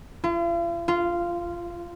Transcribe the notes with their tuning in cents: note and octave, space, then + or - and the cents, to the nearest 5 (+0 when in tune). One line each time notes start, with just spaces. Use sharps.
F4 -45
F4 -15